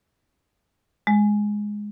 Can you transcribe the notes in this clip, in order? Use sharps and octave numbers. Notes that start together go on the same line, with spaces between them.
G#3